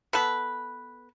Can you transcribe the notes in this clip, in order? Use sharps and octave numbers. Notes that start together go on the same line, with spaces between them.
B3 A4 B4